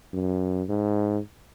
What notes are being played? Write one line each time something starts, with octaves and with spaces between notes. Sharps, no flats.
F#2
G#2